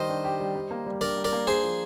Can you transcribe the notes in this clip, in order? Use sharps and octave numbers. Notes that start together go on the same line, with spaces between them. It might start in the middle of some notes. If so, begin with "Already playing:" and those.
Already playing: D#3 G3 G4 C5 D#5
D4
G4
G3
G3
A#3
G3
D4 A#4 D5
G3
A#4 D5
A#3
D4 G#4 C5
F3